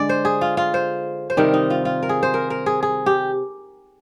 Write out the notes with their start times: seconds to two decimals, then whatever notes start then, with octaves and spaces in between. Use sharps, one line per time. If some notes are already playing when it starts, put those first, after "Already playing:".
Already playing: D3 G#3 D5
0.09 C5
0.25 G#4
0.41 F4
0.57 F4
0.74 C5
1.30 C5
1.37 C3 D#3 G3 A#4
1.54 D#4
1.70 F4
1.85 F4
2.03 A#4
2.09 G#4
2.23 C5
2.34 A#4
2.50 A#4
2.66 G#4
2.83 G#4
3.06 G4